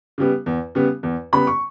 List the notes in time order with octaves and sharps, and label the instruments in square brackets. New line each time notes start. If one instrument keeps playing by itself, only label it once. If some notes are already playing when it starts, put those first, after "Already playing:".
[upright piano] C#3 G3 B3
E2
C#3 G3 B3
E2
C#3 G3 B3 B5
C#6